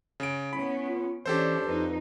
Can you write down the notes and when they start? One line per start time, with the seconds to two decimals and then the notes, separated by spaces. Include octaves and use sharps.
0.20 C#3 D7
0.53 B3 C#4 E4 B5
0.87 F4
1.26 E3 C#4 D4 G4 A4 C5
1.65 F2 D#4 B4